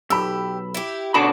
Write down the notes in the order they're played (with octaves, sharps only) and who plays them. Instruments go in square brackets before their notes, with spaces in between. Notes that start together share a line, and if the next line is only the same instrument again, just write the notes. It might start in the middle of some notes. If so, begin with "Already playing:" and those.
[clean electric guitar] B1 [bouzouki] G4 [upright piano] B5 E6
[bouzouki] E4 G4
[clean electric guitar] B2 D3 B5 [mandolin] F#4 A5 D6